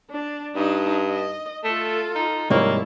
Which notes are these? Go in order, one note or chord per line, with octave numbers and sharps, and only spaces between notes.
D4
G2 D4 D#4
D#5
A3 F4 A4
D#4
C2 G#2 F3 A#3 E4 C#5